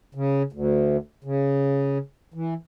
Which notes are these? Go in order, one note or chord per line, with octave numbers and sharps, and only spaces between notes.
C#3
D2
C#3
E3